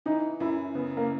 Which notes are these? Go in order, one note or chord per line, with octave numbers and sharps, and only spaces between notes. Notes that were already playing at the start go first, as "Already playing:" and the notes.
E3 D#4
F#2 E4
C#3 B3
A#3